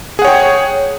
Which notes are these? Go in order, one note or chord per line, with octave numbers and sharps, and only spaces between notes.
G#4 C#5 F#5 G5